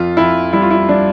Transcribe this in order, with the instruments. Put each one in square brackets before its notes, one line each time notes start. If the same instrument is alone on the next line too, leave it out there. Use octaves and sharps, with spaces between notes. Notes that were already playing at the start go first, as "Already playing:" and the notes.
Already playing: [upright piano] F2 [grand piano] F4
[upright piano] F2 [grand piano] E4
[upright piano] G3 [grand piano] E4
[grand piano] F4
E4
[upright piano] G3 [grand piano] D4